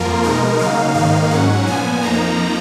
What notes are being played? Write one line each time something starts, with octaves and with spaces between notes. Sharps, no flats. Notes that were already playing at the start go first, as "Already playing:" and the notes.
Already playing: F2 F3 A#3 F4 A#4
B2 G#3 D#4 A#4
C#3 F#3 A#3 D#4 F5
G#2 D#3 A#3 D#4 F5
G#2 F#3 C#4 F#5
A#2 F3 B3 G#5
F2 F3 A#3 D#4 A#5